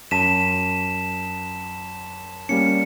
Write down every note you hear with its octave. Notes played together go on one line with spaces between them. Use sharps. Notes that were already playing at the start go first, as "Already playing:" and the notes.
F#2 A5 B6 E7
G3 A#3 C#4 C#7